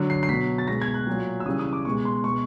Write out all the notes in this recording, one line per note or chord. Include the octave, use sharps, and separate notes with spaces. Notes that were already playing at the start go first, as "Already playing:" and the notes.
Already playing: D3 F#3
C7
C7
B2 F#3 B6
A6
B2 G#3 A#6
G#6
F#6
A#2 F#3
E6
C#3 E3 G3 D#6
D#6
D6
B2 G#3 C#6
C6
B2 G#3 C#6